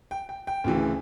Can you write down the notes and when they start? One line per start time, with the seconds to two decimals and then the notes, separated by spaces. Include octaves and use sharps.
0.11 G5
0.29 G5
0.47 G5
0.64 D2 C#3 E3